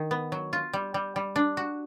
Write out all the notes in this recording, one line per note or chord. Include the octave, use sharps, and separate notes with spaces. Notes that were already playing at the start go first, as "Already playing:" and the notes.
Already playing: D#3
B3
F#3
F4
G3
G3
G3
D4
F#4